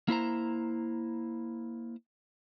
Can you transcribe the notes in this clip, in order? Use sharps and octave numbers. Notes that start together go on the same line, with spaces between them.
A#3 E4 C5 A#5